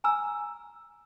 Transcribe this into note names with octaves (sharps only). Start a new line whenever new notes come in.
G#5 A#5 E6